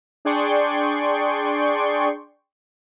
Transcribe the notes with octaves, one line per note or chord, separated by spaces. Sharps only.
D4 G#4 D5 G5 C6 C#6